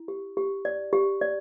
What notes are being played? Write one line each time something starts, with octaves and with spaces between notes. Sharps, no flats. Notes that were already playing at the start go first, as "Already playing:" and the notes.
Already playing: E4
G4
G4
D5
G4
D5